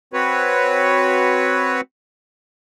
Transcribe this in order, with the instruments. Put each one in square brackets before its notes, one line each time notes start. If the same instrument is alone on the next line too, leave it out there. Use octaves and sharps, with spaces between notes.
[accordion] C4 F#4 B4 C#5